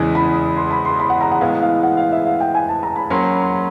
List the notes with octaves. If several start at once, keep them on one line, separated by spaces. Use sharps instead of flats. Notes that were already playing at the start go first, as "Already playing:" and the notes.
Already playing: E2 C#3 E3 G#3 G#5
B5
C6
B5
C6
B5
F#5
A#5
F#5
A2 E3 G#3 B3 F5
F5
F#5
F5
E5
F5
G5
G#5
A5
A#5
B5
F#3 A#3 C#4 C6
B5
B5
C6
C6